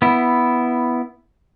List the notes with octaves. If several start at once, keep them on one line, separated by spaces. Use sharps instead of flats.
B3 E4